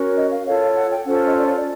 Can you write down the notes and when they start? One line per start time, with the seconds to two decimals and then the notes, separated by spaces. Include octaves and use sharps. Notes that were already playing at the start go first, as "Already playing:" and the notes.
Already playing: C#4 F#4 A#4 C#5
0.16 D#5
0.31 F5
0.45 F4 A4 C#5 F5
0.75 F#5
0.90 G5
1.05 C#4 F4 A4 C5 F#5
1.26 D#5
1.36 D5
1.46 C#5
1.56 D5